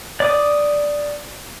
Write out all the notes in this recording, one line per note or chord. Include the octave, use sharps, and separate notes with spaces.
D5 D6 D#6